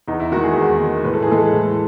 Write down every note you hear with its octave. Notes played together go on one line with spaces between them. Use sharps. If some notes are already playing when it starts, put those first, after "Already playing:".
E2 D#4
E4
D#3 G#3 F#4
G#4
E2
D#3 G#3
A2 B4
A4
G#4
E3 G#3 A4
A2